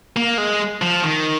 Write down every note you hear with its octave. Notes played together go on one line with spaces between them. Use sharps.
A#3
G#3
F3
D#3